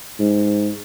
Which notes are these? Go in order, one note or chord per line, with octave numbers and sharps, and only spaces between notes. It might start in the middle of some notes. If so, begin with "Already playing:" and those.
G#2